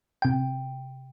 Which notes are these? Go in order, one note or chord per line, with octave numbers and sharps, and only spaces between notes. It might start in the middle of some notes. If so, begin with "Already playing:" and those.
C3 G5